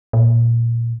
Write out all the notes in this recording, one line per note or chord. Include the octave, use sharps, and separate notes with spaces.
A#2